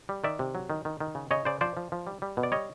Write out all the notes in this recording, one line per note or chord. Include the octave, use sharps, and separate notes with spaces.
G3
D#3 D5 E5
C3
F#3
D#3
D#3
D#3
C#3
C#3 C#5 D#5
C#3 C5 D5
F3 C5 D5
F3
F3
G3
G3
B2
D5
G3 C#5 D#5